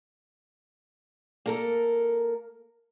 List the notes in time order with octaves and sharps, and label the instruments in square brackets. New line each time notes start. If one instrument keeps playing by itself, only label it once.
[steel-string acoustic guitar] A#3 A4 A#4